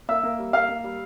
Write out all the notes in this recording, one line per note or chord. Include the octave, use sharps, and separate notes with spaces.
A#3 E5 E6
A#3
G3
A#3 F5 F6
A#3
G3